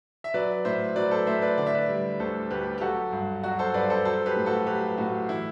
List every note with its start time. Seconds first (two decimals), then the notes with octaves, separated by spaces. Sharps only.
0.24 E5
0.34 F#3 B4 D5
0.65 A2 C5 E5
0.96 F#3 B4 D5
1.11 A4 C5
1.27 A2 C5 E5
1.42 B4 D5
1.58 D3 D5
1.66 E5
1.75 B4 D5
1.89 G3
2.20 D2 A4 C5
2.51 D2 G4 B4
2.78 G4
2.81 F#3 F#4 A4
3.12 G2
3.44 F#3 F#4
3.59 A4 C5
3.74 G2 B4 D5
3.90 A4 C5
4.05 F#3 A4 C5
4.26 G4 B4
4.36 A2
4.46 F#4 A4
4.67 F#3 G4 B4
4.98 A2 F#4
5.29 E3 E4